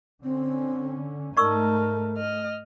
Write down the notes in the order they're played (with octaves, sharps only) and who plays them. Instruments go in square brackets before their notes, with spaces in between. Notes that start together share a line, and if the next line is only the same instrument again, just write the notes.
[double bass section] D3 C#4 [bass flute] C4
[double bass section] G#2 A3 [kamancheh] D#4 A5 [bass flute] A#4 [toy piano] D5 C#6 E6
[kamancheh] D#5 F6